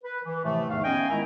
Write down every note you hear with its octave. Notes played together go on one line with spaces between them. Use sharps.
B4
E3
A2 C3 E3 F3 A3
E2 G#2 D#3 A3 F5
B3 C#4 D#5 G5 G#5
C#2 D#3 E4 E5 A#5